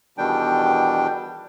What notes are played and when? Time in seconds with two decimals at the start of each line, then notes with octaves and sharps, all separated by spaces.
0.18 E2 B2 D#3 G3 D4 G5